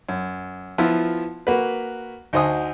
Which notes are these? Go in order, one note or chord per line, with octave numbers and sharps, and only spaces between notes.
F#2
F3 B3 E4 F4
A#3 F#4 B4
D2 D#4 F#4 C5 G#5 D#6